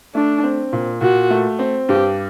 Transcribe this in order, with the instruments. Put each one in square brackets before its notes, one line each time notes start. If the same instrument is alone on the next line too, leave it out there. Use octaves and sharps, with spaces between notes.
[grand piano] A3 [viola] D4
[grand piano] C4
A#2
[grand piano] A#2 [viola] F#4
[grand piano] A3
C4
[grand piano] G2 [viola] G4